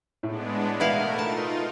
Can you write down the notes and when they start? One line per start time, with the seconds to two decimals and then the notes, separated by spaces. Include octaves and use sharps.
0.23 A2 G#3 B3 D4
0.80 B2 A3 E4 A#4 B4 F5
1.19 D#4 F4 A5